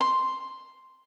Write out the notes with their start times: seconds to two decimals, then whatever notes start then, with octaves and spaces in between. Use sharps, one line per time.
0.01 C6